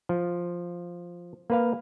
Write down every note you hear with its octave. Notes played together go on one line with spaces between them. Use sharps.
F3
A#3 B4 F5